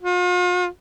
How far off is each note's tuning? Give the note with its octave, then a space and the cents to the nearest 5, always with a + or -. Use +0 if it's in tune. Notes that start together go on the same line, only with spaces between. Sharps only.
F4 +40